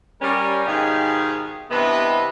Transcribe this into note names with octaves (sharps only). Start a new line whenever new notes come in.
G3 C#4 A#4
G#2 B2 D#3 G4 G#4 F5
G2 C3 E3 B3 B4 D#5